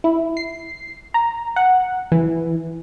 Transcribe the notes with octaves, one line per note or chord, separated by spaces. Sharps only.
E4
C7
A#5
F#5
E3